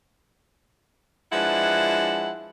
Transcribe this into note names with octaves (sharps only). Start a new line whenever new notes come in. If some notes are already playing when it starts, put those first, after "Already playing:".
F3 G#3 D4 E4 B4 F#5